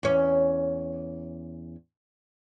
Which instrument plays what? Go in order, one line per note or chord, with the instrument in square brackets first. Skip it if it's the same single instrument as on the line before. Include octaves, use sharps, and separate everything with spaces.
[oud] E2 C#4